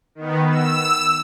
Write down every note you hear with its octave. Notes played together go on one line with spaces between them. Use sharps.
D#3 B3
E6